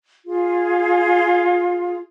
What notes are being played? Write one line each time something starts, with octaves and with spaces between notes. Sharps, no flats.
F4 G#4